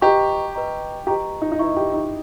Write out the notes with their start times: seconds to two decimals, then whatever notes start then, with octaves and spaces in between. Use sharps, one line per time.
0.02 G4 B4 D#5 A#5 C#6
0.55 B4 D#5 A#5 C#6
1.07 G4 B4 D#5 A#5 C#6
1.42 D#4
1.52 D#4
1.59 E4 B4 D#5 A#5 C#6
1.77 G4
1.94 D#4